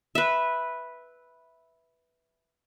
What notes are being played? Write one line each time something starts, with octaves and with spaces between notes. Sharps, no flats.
B4 E5